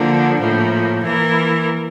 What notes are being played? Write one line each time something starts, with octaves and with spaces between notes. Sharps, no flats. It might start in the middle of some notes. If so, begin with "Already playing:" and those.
Already playing: D3 F3 A#3
A2 F3 A#3
E3 A#3 E4 A#4